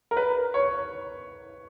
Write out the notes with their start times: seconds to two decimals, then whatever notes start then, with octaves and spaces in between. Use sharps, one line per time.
0.11 A#4
0.17 B4
0.54 C#5